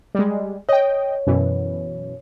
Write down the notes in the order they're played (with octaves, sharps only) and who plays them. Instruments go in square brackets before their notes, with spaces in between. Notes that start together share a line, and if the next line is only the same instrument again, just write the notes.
[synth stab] G3 G#3
[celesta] C#5 [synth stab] D#5 G5
[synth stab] F#2 B2 E3